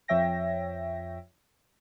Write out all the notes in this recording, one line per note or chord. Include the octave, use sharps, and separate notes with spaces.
F2 F3 C#5 E5 G5 A#6